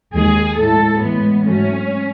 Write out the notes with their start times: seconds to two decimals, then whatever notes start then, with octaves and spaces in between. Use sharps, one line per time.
0.14 D#2 D#3 G#3 G#4
0.58 A2 G#3 A4
1.01 A2 E3 G#3 B3
1.45 G#2 F#3 A3 C#4